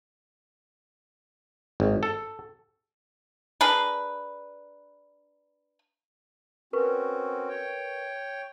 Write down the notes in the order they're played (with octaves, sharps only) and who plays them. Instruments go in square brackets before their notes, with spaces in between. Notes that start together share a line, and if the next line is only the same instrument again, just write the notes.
[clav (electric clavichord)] G#1
A4
[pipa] D4 G#4 A#4 B4
[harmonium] C4 C#4 F#4 [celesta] A#4 B4 C#6
[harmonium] C#5 G5